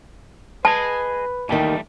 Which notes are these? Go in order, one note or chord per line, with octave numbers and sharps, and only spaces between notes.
G#4 B4 D#5 G#5 A5
D#2 D#3 E3 G3 A3